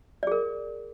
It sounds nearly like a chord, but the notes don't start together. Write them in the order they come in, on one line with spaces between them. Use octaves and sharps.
D5 G#4 A#4